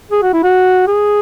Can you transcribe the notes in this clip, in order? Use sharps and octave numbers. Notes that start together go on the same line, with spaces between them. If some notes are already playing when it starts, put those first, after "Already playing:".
G#4
F#4
E4
F#4
G#4